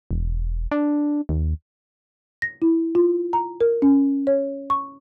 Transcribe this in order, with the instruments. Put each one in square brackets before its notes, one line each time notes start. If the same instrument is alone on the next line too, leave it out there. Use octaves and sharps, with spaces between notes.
[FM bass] E1
D4
D#2
[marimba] A#6
E4
F4
A#5
A#4
C#4
C#5
C#6